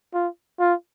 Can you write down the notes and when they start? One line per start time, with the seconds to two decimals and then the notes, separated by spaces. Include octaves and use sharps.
0.14 F4
0.60 F4